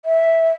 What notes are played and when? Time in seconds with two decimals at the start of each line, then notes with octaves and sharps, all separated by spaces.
0.05 E5